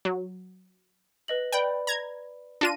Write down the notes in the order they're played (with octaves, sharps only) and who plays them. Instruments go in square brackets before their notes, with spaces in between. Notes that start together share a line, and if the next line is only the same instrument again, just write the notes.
[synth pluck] F#3
[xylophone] B4 D#5 F#7
[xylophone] B4 D5 B5 [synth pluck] G5
[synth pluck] A#5 G#6
[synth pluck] D4 F4 D#7 [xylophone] A#6